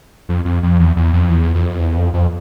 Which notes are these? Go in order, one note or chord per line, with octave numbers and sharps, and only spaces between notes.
F2
F2
F2
E2
E2
F2
E2
F2
E2
F2
F2